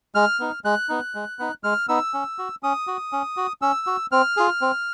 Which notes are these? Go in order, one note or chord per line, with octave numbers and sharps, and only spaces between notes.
G#3 F6
B3 D#4
G#3 F#6
B3 D#4
G#3
B3 D#4
G#3 F6
B3 D#4 E6
C#4
F#4
C#4 D#6
F#4
C#4
F#4
C#4 E6
F#4
C4 F6
F4 G#4
C4